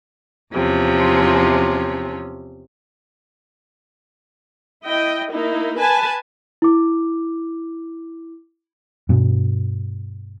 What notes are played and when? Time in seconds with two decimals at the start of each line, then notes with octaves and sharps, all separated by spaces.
0.53 E2 C3 F3 C#4
4.86 E4 D#5 G5
5.32 A#3 D#4 E4
5.79 B4 G#5 A5
6.62 E4 D6
9.09 G2 B2